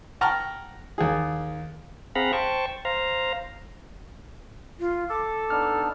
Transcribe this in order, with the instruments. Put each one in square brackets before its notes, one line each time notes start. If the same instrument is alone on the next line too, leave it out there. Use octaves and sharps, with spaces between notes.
[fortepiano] F#5 G5 A5 A#5 C#6 F6
D#2 G#4
[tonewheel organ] C4 G#4 F5 F#5 A#5 B5
C5 G5 A5 C#6
C5 F5 A#5
[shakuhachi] F4
[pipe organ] A4 [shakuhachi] D6
[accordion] B3 D4 D#4 [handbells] F6